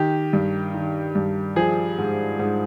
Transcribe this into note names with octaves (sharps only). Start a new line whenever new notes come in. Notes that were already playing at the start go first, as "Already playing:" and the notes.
Already playing: D#3 G4
G2
D#3
G2
F3 G#4
G#2
G#2